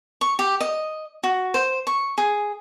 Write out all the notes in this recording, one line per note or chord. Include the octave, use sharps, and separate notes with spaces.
C#6
G4
D#5
F#4
C5
C#6
G#4